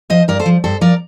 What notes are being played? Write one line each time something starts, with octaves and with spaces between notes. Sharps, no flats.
F3 C5 D#5
G2 A#4 D5
A4 C5
F3
G2 A4 C5
F3 A#4 D5